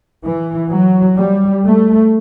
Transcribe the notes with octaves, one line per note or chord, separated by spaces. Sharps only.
E3
F#3
G3
A3